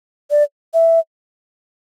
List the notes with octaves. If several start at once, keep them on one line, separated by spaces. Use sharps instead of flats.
D5
E5